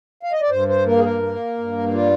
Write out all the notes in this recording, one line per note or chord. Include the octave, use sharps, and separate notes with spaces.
F5
D#5
D5
G2 C5
C5
A#3 A#4
G#4
A#4
A#3
G2
G3 F4